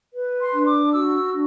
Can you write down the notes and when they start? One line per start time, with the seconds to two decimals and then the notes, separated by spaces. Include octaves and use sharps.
0.12 B4
0.39 C6
0.53 D4
0.66 D6
0.92 F#4 E6
1.32 D4